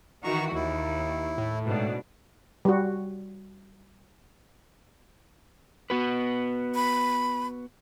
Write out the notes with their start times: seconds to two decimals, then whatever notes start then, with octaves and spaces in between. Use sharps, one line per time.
0.24 D#3 E3 F#4 A#5 C#6
0.55 D#2 E4
1.38 A2
1.66 G#2 B2 D4
2.65 G3 F#4
5.90 B3 F#4 B4
6.75 B5